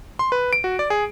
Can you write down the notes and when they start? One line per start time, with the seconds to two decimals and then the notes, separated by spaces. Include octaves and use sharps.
0.19 C6
0.32 B4
0.53 D7
0.64 F#4
0.79 D5
0.90 G#4